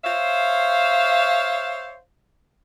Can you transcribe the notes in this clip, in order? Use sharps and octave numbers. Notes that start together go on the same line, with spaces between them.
C5 C#5 E5 F5